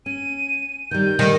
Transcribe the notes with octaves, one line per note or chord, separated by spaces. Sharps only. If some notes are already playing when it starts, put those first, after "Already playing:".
C#4 D#7
D#3 G3 G6
D#3 G3 A3